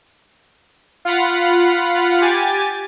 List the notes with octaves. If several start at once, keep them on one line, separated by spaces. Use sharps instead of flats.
F4 F5 F#5 B5
G4 G#5 A6